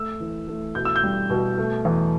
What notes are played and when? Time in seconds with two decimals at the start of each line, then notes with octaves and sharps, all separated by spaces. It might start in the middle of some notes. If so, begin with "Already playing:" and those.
Already playing: A3 E6
0.20 E3
0.48 A3
0.75 B2 G6
0.85 E6
0.96 G6
1.03 G3
1.30 B2
1.58 A3
1.85 E2